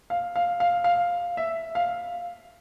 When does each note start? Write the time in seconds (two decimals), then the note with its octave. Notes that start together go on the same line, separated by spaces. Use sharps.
0.10 F5
0.36 F5
0.60 F5
0.84 F5
1.37 E5
1.75 F5